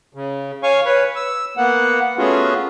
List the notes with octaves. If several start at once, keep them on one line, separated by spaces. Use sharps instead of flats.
C#3
C#5 F5 G#5 C#6
B4 C#5
E6
A#3 B3 F#5
A3 B3 C#4 F4 F#4 G#4